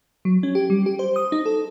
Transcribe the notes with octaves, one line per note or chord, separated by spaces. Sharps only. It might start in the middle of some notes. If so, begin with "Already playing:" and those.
F#3
C#4
G4
G3
G4
C5
D#6
D#4
A4